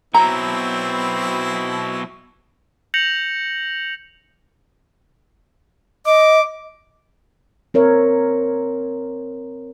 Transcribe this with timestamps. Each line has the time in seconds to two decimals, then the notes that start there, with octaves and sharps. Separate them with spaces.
0.14 B2 F#3 C4 E4 A#5
2.94 G6 A#6 C#7 F7 F#7
6.06 D#5 D6
7.74 C4 A#4 C#5 E5